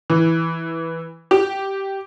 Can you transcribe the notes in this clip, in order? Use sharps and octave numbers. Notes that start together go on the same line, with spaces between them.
E3
G4